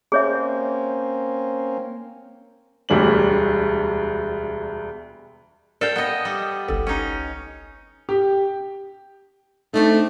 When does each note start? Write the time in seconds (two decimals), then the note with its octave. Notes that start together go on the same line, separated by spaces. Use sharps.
0.12 A#3 C4 C#4 G#4 C#5 E5
2.89 E1 D2 G3 F#7
5.81 A4 A#4 D5 F5 G5
5.96 B3 D#5
6.25 G3
6.68 G1 C2 A4
6.87 C#4 D#4
8.09 G4
9.74 A3 C4 D4 D#4